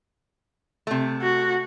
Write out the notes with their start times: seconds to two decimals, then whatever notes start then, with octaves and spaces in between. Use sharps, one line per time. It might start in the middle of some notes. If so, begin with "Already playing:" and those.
0.87 C3 A3
1.22 F#4